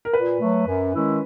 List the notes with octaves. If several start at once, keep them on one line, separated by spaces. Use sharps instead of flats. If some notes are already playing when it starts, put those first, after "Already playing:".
A#4
A#2 B4
F#3 A3
F#2
D#3 G#3 C#4 E4